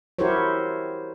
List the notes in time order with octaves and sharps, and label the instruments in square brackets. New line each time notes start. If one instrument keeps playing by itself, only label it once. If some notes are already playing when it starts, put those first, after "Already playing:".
[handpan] E4 F#4 G4 A#4 C5 C#5